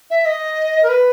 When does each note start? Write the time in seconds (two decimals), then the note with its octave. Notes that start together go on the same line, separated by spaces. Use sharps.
0.10 E5
0.26 D#5
0.83 A#4
0.89 B4